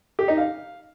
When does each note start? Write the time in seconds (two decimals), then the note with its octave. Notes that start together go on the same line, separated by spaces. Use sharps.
0.19 G4
0.28 D#4
0.38 F5